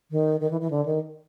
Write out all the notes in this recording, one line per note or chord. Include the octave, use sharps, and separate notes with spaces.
D#3
D#3
E3
E3
D3
D#3